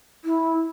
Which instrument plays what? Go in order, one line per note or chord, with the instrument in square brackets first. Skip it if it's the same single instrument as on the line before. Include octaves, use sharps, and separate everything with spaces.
[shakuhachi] E4